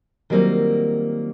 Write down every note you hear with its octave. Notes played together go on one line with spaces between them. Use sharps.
D#3 F#3 G3 A#3 C4 F4